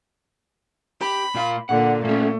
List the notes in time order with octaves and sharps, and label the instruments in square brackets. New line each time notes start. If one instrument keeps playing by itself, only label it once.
[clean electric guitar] G4 [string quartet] B5
[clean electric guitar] A#2 F4 F5
[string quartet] A#2 D3 [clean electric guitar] F#5
[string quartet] A3 [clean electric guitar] A#3 C#4